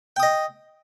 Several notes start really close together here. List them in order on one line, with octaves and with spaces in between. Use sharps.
G5 D#6 D#5